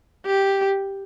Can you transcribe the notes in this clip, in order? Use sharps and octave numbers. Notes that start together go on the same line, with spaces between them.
G4